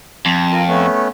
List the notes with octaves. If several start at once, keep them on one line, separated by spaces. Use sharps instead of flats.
F2
F4 A#4
A3 B3 C#4